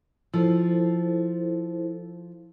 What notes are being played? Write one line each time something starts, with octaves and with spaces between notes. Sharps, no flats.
F3 E4 A4 C5